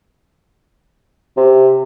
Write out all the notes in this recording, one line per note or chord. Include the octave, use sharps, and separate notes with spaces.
C3